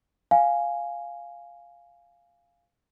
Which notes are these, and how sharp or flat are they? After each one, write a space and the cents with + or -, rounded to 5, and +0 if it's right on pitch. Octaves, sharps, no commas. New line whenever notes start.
F5 +0 G#5 +0